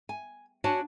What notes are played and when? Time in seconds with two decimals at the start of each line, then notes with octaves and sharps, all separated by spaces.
0.09 G#5
0.64 D4 F#4 C#5 F#5 G#5 A5